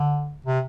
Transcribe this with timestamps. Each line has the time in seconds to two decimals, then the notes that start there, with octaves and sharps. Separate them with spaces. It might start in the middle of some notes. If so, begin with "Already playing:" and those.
Already playing: D3
0.46 C3